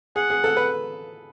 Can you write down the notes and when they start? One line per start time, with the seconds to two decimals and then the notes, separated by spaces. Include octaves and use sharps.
0.16 G#4 F#5
0.30 G#4
0.44 A4
0.57 B4